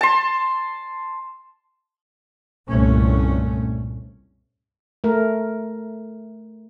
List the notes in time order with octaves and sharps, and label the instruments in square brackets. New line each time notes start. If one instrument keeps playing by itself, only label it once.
[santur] A5 C6
[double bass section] C2 G2 A#2 A3 C#4
[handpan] A3 A#4